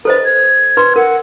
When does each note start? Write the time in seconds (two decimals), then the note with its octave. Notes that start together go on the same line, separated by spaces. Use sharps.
0.05 A4 B4 C5 D#5
0.25 G#6
0.77 B4 C6
0.96 A#4 F#5